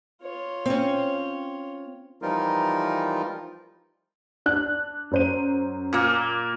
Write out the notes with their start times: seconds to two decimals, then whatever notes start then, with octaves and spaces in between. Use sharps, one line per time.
0.22 F4 C#5
0.66 C4 C#4
2.22 E3 F3 G3 D#4 F4 A#4
4.46 D4 F#6
5.11 F#2 C5 D#7
5.93 A#2 A#3